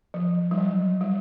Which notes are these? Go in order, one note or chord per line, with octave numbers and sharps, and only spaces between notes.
F3
G3
F#3
G3